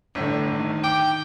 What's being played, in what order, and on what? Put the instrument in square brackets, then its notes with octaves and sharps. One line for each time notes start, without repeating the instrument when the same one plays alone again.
[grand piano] G1 A2 [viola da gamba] D3
[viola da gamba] D#3
[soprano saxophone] G5 [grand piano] D6